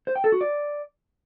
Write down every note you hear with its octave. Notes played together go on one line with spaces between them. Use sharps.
C5
G5
A4
F#4
D5